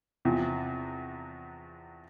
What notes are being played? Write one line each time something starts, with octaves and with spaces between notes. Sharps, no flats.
E2 C3 F3